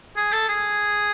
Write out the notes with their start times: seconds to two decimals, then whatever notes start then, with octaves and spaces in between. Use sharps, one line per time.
0.16 G#4
0.33 A4
0.48 G#4